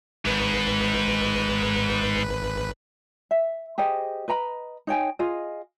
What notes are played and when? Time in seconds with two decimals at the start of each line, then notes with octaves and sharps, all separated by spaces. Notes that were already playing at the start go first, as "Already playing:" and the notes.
0.25 G#1 G#2 B4
3.31 E5
3.78 G4 G#4 C5 D#5
4.28 B4 D#5 A#5 B5
4.87 D#4 C#5 G5 G#5
5.19 F4 G#4 D#5